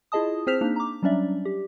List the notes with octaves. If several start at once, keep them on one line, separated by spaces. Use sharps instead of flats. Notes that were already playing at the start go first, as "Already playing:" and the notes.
E4 F4 G#4 D#5 A5 D#6
C4 G#4 C5 F6 B6 F7
A#3 D4 D#4
A#5 D6
F#3 G3 C#4 D4 D5 E5
G4